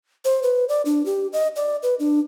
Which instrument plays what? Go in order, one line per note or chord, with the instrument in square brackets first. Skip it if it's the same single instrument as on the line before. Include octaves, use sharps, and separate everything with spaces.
[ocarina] C5
B4
D5
D4
G4
D#5
D5
B4
D4